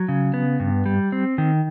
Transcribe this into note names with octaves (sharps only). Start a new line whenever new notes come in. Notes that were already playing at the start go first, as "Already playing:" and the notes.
Already playing: F#3
C#3
B3
G2
G3
C4
D#3